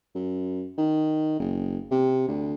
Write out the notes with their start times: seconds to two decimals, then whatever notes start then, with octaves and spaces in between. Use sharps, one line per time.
0.15 F#2
0.78 D#3
1.39 F#1
1.91 C3
2.28 D2